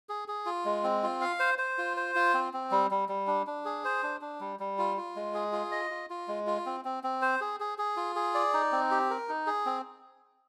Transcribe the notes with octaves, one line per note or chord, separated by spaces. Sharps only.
G#4
G#4
F4
G#3
C4
F4
F5
C5
C5
F4
C5
F4
C4
C4
G3
G3
G3
D4
D4
G#4
C5
D4
D4
G3
G3
F4
F4
G#3
G#4
F4
D#5
F4
F4
G#3
F4
C4
C4
C4
C5
G#4
G#4
G#4
F4
G#4
D5
D#4
C4
G4
A#4
D#4
G#4
C4